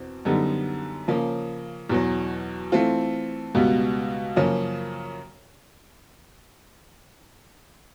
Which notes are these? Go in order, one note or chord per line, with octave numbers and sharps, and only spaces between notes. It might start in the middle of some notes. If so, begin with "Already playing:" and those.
Already playing: E2 B2 C4
F#2 D3 G3 B3 D#4
C#3 F3 A#3 C#4
E2 B2 F#3
E3 A3 C4 F4
C#2 B2 G3 B3
F#2 C#3 F3 A#3 C#4